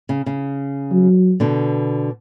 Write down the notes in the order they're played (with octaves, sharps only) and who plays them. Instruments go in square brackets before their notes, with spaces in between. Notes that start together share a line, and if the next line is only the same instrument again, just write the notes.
[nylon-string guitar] C#3
C#3
[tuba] F#3
[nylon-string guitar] B2 D3